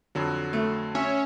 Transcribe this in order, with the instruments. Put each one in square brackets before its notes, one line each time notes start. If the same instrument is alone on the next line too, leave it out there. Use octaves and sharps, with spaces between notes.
[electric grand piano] F2 D3 F#3
[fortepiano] A3
[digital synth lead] C#4 [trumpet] E5